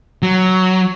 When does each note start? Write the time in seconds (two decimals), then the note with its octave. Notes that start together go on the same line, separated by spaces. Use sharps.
0.22 F#3